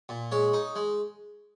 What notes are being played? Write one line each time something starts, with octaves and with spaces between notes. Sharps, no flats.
A#2
G#3 C#5
D#4
G#3